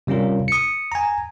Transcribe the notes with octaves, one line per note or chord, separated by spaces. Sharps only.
C3 G3 C#4 F4 A#4
D#6 C#7
G#5 A#5